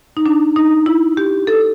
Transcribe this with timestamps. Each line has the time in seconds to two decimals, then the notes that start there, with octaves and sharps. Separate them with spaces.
0.17 D#4
0.26 D4
0.56 D#4
0.86 E4
1.17 G4
1.47 A4